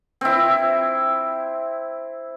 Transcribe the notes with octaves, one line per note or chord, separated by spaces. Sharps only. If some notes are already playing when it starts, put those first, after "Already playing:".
C4 E4